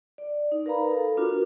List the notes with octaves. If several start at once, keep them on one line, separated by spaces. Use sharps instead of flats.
D5
D#4
A#4 B4 F5 A#5 B5
A4
D4 F4 F#4 A#4